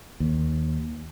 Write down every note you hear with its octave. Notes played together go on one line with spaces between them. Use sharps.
D#2